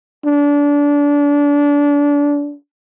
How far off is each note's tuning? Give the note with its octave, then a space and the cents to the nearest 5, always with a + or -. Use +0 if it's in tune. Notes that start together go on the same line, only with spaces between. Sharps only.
D4 -25